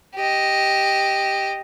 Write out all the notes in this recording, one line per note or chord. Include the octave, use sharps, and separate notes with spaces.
G4 D#5